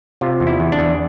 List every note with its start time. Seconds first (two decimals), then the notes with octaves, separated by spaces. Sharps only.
0.21 C3 F4
0.40 E2
0.47 E4
0.60 E2
0.72 D4
0.79 E2